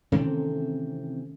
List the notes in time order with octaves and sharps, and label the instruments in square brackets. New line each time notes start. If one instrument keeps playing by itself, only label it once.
[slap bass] C3 E3 C4 [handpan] D#3 A3 C#4